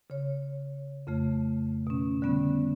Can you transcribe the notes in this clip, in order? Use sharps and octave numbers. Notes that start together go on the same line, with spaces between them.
C#3 C#5
F2 C#3 A3
B2 C#4
D3 G3 B3 C#4